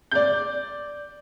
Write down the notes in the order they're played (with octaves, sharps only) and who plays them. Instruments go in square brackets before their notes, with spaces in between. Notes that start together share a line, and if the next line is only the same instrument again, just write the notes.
[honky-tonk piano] D5 G6